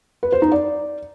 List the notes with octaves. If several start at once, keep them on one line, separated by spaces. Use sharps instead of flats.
B4
C5
D#4
D5